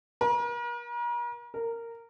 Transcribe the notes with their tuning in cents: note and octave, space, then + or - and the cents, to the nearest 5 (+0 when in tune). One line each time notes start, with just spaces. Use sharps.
A#4 +40
A#4 -15